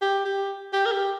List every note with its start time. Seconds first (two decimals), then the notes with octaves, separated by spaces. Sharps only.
0.01 G4
0.25 G4
0.73 G4
0.85 A#4
0.91 G4